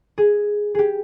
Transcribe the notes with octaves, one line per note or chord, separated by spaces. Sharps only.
G#4
G4 G#4